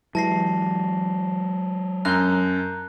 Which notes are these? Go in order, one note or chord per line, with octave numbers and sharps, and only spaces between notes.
E3 F#3 G#3 A5 A#6 C7
F#2 A#5 F#6 G6